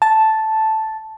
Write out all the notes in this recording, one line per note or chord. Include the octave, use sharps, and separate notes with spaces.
A5